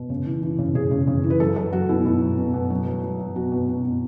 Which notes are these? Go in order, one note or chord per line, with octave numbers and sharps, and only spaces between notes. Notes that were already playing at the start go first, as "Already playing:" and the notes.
Already playing: B2
C#3
E3
E3
C#3
C#3 G#4
C#3
C#3
E3
B4
F#3 A4
F#3 A4
F#3 F#4
B2 E4
B2 E4
F#3
B2
B2
F#3
F#3
F#3
F#3
B2 F#4
B2
B2
B2